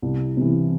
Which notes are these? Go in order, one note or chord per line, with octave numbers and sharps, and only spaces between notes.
C2
C3 E3